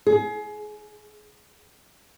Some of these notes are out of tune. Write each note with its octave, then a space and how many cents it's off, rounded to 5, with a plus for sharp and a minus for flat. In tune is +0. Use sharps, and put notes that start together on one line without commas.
G#4 +25